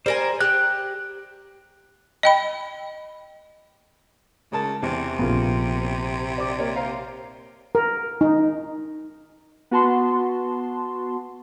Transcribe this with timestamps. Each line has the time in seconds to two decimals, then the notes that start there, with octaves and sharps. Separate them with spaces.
0.06 G3 A#4 C5 G#5
0.40 G4 F#6
2.23 D#5 G5 B5
4.52 C#2 C#3 A#4 A5
4.83 E2 C3
5.19 A#1 C#3 A#3 B3 F4
6.38 D5 D6
6.59 A#3 C#5 D5
6.76 C5 F5 A#5
7.75 A#4
8.21 D#4
9.71 B3 F#4 A5 C6